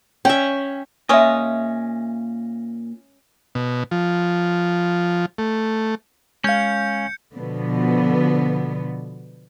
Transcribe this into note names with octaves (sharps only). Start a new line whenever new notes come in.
C#4 E5 G5
A#2 G#3 C#4 E5 D#6
B2
F3
A3
G#3 C#4 F5 G6 C#7
B2 D3 F3 B3